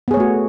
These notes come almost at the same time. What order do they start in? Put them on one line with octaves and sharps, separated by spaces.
B3 G#4 C#5 A3 F#4